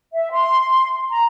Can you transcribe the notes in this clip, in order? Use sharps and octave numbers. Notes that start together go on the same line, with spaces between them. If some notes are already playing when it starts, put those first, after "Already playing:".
E5
C6
A#5